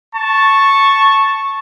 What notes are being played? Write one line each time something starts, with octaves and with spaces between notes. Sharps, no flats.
A5 C#6